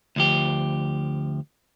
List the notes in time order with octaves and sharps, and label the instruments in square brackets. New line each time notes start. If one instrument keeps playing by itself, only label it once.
[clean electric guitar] D2 F3 G4